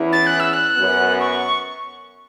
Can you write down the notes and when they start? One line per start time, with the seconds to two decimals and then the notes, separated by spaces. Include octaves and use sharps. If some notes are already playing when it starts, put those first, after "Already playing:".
Already playing: E2 E3 C#4 E4
0.13 A6
0.27 F#6
0.40 E6
0.53 F#6
0.77 F#2 F#3 B3
1.20 C#6